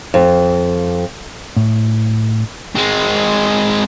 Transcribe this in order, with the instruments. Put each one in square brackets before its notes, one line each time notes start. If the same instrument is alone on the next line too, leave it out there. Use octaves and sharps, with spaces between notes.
[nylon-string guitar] F2
[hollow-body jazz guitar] A2
[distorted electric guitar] G#3 C4